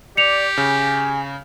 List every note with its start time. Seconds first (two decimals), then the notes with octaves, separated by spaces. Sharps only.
0.17 G4 D5 C#7 F7
0.57 C#3 G#5